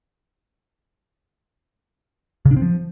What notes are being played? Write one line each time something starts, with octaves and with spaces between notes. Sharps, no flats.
C#3
D4
C4
F3